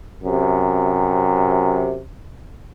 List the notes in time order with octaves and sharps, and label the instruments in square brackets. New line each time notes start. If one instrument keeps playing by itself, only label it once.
[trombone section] F#2 C3